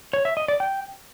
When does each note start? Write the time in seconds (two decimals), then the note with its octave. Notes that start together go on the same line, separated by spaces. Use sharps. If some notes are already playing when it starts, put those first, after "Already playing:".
0.13 C#5
0.25 E5
0.37 D#5
0.48 D5
0.60 G5